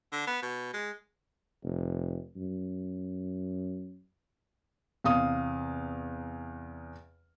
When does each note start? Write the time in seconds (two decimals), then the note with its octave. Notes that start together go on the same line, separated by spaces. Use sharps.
0.12 D3
0.27 B3
0.42 B2
0.73 G#3
1.63 F1
2.36 F#2
5.04 E2 C3 F5 D#6